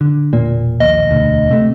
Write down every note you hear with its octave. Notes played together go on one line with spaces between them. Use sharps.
D3
E1 A#2 A#3
A#1 D#2 D#5
E1 D2
C3 A3